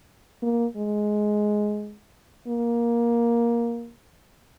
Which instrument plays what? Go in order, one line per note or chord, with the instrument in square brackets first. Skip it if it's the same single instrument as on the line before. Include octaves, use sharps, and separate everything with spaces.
[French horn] A#3
G#3
A#3